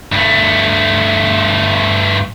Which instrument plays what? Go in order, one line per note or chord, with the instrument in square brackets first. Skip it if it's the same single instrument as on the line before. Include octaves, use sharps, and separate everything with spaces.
[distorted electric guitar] G2 A3